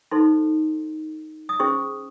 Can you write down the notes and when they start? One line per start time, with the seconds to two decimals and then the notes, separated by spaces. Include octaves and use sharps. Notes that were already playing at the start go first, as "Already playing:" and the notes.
0.11 D#4 A4 C5 C6
1.49 D#6
1.60 C#4 G#4 C5 C#6